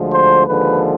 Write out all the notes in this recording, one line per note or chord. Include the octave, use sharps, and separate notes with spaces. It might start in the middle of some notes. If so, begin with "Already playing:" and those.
Already playing: D2 D3 F3 G#3
C5
D#2 D3 F3 G#3 B4